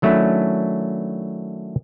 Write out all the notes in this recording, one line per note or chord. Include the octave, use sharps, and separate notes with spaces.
D#3 F#3 A3 C#4 D4 E4